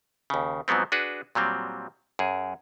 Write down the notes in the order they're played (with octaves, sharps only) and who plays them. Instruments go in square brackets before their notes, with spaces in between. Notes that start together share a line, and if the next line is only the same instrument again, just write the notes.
[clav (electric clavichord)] D#2 C#3
G#2 F3 F#3 B3 C4
D4 F#4 G#4 B4
A#2 F#3 G3 C4
F#2 G#4